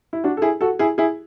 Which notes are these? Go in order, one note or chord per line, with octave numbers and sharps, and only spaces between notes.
E4
D4 F#4
A4
E4 G#4
F#4 A4
E4 G#4
E4 G#4